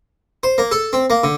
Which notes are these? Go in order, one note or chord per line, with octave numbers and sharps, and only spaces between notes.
C5
A#3
A4
C4
A#3
D3